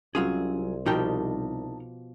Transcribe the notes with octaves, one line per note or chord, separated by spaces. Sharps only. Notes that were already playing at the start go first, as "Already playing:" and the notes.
C2 F#3 C4 C#4 F4 G#4
B2 F3 D#4 G4 A#4 G5 A5